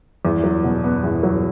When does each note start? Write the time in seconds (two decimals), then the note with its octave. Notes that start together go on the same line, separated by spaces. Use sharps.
0.25 E2
0.43 F#3
0.64 B2
0.84 B3
1.04 E2
1.23 F#3